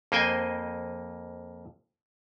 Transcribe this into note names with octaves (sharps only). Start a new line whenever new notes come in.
F2 A#3 C5 D#5 G5 G#5